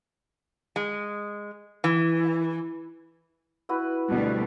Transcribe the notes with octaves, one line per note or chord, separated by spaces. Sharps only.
G#3
E3
E4 F#4 B4
D2 B2 G3